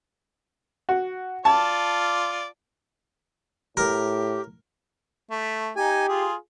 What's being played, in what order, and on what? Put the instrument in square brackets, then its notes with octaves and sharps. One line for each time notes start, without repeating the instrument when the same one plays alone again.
[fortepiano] F#4
[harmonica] F4 D5 [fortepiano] A5
[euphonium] A2 [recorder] G4 [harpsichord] A#4
[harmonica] A3
[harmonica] D#4 G#5 [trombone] G4
[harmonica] F4 G#4